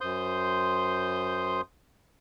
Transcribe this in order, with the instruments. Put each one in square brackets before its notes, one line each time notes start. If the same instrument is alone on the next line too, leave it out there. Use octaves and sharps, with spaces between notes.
[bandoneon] F#2 C5 C6 D#6 G6